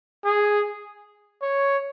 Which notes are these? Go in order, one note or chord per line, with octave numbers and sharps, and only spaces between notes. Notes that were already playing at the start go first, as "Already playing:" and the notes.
G#4
C#5